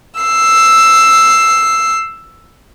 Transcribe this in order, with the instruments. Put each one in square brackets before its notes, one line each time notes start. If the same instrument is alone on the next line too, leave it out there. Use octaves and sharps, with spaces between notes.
[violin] E6 C7